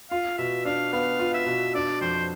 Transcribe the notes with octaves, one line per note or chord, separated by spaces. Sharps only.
F4 F5
B2 E5
D4 F5
B3 F5
F4
E5
B2
D4 D5
F2 C5